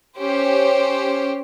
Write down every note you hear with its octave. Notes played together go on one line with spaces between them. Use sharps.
C#4 G4 C5